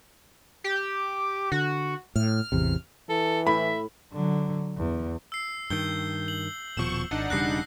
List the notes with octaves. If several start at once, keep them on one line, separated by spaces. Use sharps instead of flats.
G4
D3 F#4
A2 F6
A1 E2 C3
E3 A4
A2 E5 B5
D3 F#3
E2
E6 C7
G2 D#3 G6 G7
F#7
D#1 B2 F3 C#6 E7
G#1 D4 D#4 F#5
E1 C#3 G3 F#6 A#6 C7